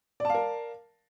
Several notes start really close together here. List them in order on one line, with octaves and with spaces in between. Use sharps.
D5 A5 F5 A#4